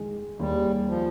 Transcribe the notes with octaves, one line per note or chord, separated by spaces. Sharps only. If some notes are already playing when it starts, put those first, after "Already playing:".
Already playing: D#3 G#3
D#2 G3
F3